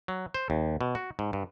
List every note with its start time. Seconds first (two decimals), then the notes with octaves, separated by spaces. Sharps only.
0.08 F#3
0.34 C5
0.50 D#2
0.81 B2
0.95 F#4
1.19 G#2
1.33 G2